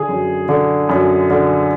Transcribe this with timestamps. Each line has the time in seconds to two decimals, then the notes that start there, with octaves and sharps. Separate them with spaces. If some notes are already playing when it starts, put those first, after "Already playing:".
Already playing: D3 G#4
0.09 F#2
0.49 D3
0.89 F#2
1.30 D3